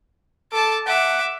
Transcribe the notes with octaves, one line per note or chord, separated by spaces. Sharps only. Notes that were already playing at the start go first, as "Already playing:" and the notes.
A4 A5 D6
E5 F#5 D6